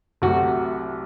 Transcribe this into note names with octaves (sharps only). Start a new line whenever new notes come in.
C2 C3 F#3 A3 F#4